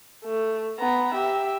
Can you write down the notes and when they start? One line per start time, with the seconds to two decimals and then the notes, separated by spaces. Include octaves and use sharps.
0.24 A3
0.78 B3 A#5
1.14 G4 E5